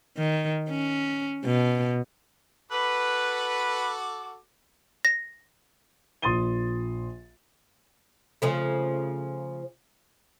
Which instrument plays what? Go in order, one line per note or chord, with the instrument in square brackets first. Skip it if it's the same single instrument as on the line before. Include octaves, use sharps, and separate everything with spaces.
[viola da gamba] D#3
C#4
B2
[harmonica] F#4 A4 D6 [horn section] B4
[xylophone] A#6
[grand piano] A#1 C6 D#6 A6 D#7 G7
[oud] C#3 F3 A3